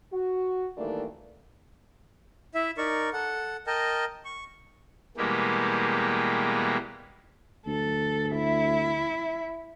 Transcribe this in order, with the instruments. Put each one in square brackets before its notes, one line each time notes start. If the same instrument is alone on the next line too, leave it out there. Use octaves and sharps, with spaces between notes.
[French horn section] F#4
D#3 E3 G3 A3 A#3 D4
[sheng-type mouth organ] E4 E5
D#4 A#4 D5 C#6
A4 F#5
A#4 D#5 G5 A5
C#6
[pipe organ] B2 E3 G3 G#3 A#3 G4
[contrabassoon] D2 [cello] A4
[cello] E4 E5